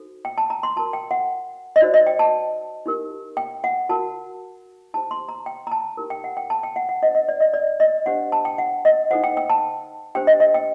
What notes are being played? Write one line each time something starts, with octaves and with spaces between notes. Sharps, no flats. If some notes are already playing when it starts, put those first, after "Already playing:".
Already playing: D#4 F#4 A4 C5
G5
A5
A#5
C6
F#4 A#4 A5
G5
F#5
D#5
D#4 F#4 C5 D5
D#5
G5
A5
D#4 G4 A#4
G5
F#5
F#4 A#4 A5
D#4 G4 C5 A5
C6
A#5
G5
A#5
A5
D#4 G4 A#4
G5
F#5
G5
A5
G5
F#5
F#5
D4 A4 C5 D#5
D#5
D5
D#5
D5
D#5
D4 G4 C5 F#5
A5
G5
F#5
D#5
D#4 A4 C5 F#5
G5
G5
A5
D4 G4 C5 G5
D#5
D#5
G5